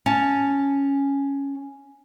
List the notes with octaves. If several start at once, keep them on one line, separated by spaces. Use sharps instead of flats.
C#4 A5